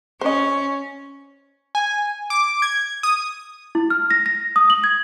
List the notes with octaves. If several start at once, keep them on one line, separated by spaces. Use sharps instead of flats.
C#4 C5 D#5
G#5
D6
G#6
D#6
E4
F6
A#6
A#6
D#6
F#7
G#6